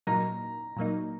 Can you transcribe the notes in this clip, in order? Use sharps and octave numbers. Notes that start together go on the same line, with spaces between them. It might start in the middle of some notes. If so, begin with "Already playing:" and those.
A#2 F#3 A#3 D#4 A#5
A#2 F#3 A#3 D#4